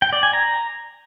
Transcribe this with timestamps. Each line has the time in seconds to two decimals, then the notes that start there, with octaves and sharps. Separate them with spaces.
0.02 G5
0.13 D5
0.23 G#5
0.33 A#5